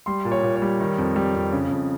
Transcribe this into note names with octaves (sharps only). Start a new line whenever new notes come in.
G3 C6
A#2
C#5
A#2
C#5
G3
D#3
F2
G3
F2
C#3
F2